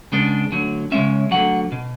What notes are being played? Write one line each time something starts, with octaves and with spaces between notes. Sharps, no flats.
C#3 G#3 B3 D4
D2 D3 F#3
C#3 G#3 C#4 E5
D2 D3 F#3 F#5
B2